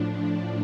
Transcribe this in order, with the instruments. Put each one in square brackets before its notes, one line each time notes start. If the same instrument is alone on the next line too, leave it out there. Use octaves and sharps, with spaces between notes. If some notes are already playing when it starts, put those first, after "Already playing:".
Already playing: [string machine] A2 F3 D4